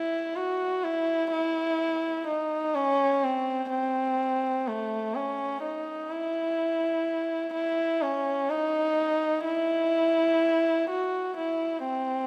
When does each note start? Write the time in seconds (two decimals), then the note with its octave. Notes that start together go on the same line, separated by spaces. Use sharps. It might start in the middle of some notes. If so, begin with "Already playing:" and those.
Already playing: E4
0.36 F#4
0.83 E4
1.32 E4
2.27 D#4
2.75 C#4
3.24 C4
3.71 C4
4.67 A3
5.15 C#4
5.62 D#4
6.10 E4
7.54 E4
8.01 C#4
8.50 D#4
9.45 E4
10.90 F#4
11.37 E4
11.85 C4